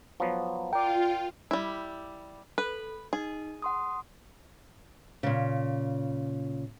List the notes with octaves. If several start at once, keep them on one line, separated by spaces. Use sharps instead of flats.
F3 F#3 B3
F4 A#4 D5 G5
G3 E4
A4 B4
D#4 G#4
F#5 C6 D#6
A#2 C#3